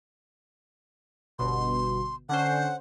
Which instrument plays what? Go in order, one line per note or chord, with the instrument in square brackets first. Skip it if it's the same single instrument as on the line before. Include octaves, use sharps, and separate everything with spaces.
[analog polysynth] G1 B2 [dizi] C6
[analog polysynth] D3 C#4 C5 [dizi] F#5